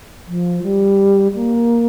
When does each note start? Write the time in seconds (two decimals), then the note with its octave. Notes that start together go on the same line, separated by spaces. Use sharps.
0.27 F3
0.63 G3
1.35 A#3